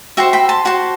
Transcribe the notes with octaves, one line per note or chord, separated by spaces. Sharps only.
F#4 C5 E5 G5
G5 B5
A5 C6
F#4 C5 F#5 A5